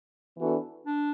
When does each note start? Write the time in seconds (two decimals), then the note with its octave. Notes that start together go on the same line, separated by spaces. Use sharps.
0.38 E3 B3 D4 F#4 A4
0.87 D4